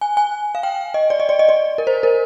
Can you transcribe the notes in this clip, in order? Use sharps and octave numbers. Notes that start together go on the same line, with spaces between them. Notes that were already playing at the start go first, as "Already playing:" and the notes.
G#5
G#5
F5
G5
D#5
D5
D#5
D5
D#5
D5
A#4
C5
A#4